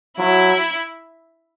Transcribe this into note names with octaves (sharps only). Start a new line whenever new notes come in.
F#3 E4